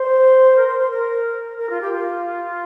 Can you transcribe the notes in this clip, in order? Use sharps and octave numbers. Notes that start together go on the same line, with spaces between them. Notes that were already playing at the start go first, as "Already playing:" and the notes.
Already playing: C5
A#4
C5
C5
A#4
A#4
F4
G4
F4